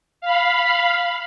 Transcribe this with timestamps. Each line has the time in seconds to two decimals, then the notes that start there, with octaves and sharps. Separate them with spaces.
0.21 F5 B5